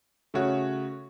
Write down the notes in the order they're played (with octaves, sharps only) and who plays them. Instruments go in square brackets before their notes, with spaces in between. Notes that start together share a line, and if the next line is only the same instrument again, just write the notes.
[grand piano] C#3 A3 F#4 C#5